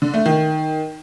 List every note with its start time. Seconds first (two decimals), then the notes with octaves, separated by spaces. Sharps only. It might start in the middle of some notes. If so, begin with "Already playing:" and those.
0.02 D3
0.14 A3
0.26 D#3